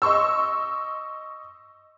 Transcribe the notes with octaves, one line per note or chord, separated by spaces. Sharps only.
D#5 C6 C#6 E6